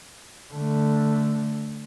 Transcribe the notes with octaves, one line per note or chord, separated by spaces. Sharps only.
D3 A3